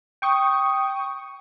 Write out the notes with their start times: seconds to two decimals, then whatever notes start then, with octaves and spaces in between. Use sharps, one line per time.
0.22 G5 C#6 D#6